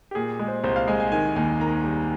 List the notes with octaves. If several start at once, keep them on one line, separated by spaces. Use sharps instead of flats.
G4
A#2 G#4
G#3
C5
C2 C5
F5
G#3 G#5
G#5
D#3 G#5
D#2 G#5
D#3 A#5
G3